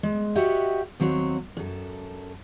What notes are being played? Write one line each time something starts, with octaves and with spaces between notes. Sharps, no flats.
G#3
F#4 G4 C#5 D#5 E5 F#5
D#2 F#3 C4 C#5
F#2 A4